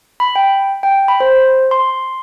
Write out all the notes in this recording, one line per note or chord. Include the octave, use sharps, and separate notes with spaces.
B5
G5
G5
B5
C5
C6